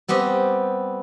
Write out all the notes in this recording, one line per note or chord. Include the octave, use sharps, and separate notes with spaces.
G3 B3 C4 G4 D#5